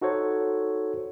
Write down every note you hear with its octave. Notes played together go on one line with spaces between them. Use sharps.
D#4 F#4 A4 C5 C#5